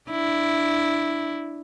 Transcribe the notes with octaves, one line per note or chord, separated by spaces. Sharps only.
D4 E4